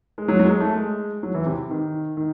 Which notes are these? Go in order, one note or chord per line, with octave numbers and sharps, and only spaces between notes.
G#3
F#3
F#3
G#3
A3
G#3
F#3
E3
C3
D#3
D#3